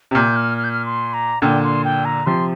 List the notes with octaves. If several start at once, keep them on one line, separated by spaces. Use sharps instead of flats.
C3
A#2 G6
F6
F6
G6
F6
C6
A#5
A#2 D3 G5
C6
G5
A#5
C3 F3 C6